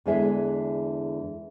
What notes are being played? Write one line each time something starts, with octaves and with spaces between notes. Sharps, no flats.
E2 D3 E3 G#3 G#4 E5